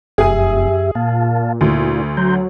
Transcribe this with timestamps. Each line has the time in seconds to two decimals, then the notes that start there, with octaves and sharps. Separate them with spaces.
0.18 F1 F#2 G4 G#4 E5 G#5
0.95 A#2 F5 A5
1.61 D2 E4
2.17 F#3 A#5 C6 G6